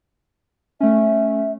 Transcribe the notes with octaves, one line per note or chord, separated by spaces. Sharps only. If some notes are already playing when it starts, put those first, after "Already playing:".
A3 C#4 E5